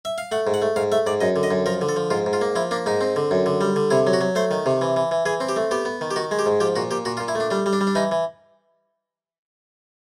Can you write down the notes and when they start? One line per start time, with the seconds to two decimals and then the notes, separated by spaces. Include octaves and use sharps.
0.05 E5
0.18 F5
0.32 A3 F#5
0.47 G#2
0.54 F#5
0.62 A3
0.76 G#2 F5
0.92 A3 E5
1.06 G#2 D5
1.21 F#2 D#5
1.36 D3
1.43 D#5
1.51 F#2
1.66 F3 A#4
1.81 D3
1.89 A4
1.96 F3
2.11 G#2 F4
2.26 G#2
2.33 F4
2.41 A#3
2.56 F3 E4
2.71 A#3 D4
2.86 G#2 D#4
3.01 C4
3.16 D3
3.31 F#2
3.46 D3
3.61 G3
3.76 D3
3.91 C3 E4
4.07 F#3
4.13 F#4
4.21 F#3
4.35 A3 C5
4.51 D#3
4.66 C3
4.81 E3
4.96 E3
5.11 E3
5.26 E3 G#4
5.40 C4
5.49 G4
5.56 A3
5.71 B3 G4
5.85 B3
6.01 D#3
6.11 G4
6.16 D#3 F#4
6.31 G#3
6.39 G4
6.46 G#2
6.60 F3 G4
6.76 A#2 F#4
6.91 A#2 G4
7.05 A#2 F#4
7.17 F4
7.20 A#2
7.28 E4
7.35 A3 D4
7.51 G3 D4
7.66 G3
7.73 D4
7.81 G3
7.87 D4
7.95 E3 D#4
8.11 E3